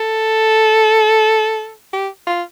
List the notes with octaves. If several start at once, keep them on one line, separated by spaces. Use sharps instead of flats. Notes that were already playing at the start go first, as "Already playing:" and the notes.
Already playing: A4
G4
F4